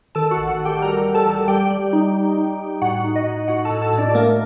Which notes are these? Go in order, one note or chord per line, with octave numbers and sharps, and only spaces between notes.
D#3 A4 A5
F#4 F#5
A1
F#4 F#5
D#3
G4 G5
G3 A#4 A#5
A1
A4 A5
A1
G3 G4 G5
G3
D#4
D#4
D#4
D#4
A2 F#4 F#5
D#4
D#4 D#5
A2
A2 F#4 F#5
A4 A5
A2
A4 A5
A2
D4 D5
A3 A#3 A#4